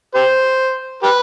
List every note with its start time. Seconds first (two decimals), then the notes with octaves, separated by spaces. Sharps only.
0.15 G4 C5
1.03 G4 B4